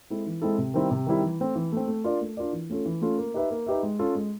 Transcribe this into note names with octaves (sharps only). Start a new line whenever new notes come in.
G#3 C4 E4 A4
E3
G#3 C4 E4 A4
C3
D#3 G3 C4 E4
C3
D#3 G3 C4 E4
E3
A3 C4
E3
A3 C4
A3
D4 F4 A#4 D5
A3
D4 F4 A#4 D5
E3
A3 C#4 F4 A4
E3
A3 C#4 F4 A4
A#3
D#4 G4 B4 E5
A#3
D#4 G4 B4 E5
G#3
C#4 F4 A4
G#3